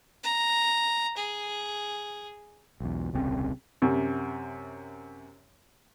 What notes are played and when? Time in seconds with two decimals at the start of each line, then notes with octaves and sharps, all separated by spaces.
0.24 A#5
1.17 G#4
2.80 B1 E2
3.13 D#1 C2 C#3 C4
3.82 F#2 C3